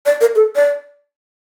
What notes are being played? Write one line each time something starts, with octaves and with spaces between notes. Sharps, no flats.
D5
A#4
A4
D5